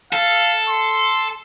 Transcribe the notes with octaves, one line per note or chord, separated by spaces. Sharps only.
A4 F5
C6